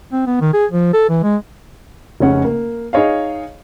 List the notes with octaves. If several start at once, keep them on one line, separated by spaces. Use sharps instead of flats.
C4
B3
D#3
G#4
F3
A4
E3
G#3
F1 C#3 C#4 F#5
A#3
D#4 G#4 C#5 D#5 F5